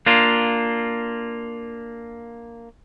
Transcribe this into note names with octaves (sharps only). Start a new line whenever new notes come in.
A#3 D4 F4